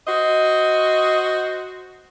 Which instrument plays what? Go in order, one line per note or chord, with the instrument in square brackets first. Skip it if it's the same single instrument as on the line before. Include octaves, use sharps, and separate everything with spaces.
[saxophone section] F#4 C5 D#5